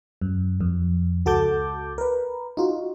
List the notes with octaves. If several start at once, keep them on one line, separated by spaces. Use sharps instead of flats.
F#2
F2
C#2 F#4 A4 A5 D6 G6
A#4 B4
D#4 F4 F#4